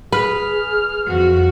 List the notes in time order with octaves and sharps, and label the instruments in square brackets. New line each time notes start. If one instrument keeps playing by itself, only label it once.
[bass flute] G#4 [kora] B4 [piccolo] F6
[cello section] F2 F#4